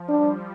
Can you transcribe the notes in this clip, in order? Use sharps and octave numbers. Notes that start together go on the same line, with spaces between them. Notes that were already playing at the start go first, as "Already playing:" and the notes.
Already playing: F3
G3 D4